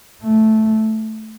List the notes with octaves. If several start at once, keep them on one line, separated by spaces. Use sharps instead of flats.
A3